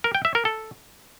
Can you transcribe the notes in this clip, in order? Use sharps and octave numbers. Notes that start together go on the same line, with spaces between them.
A#4
G5
E5
A#4
A4